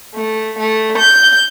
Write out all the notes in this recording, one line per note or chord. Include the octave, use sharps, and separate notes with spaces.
A3
A3
G6